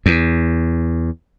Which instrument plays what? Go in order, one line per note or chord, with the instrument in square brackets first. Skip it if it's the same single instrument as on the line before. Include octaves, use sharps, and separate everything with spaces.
[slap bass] E2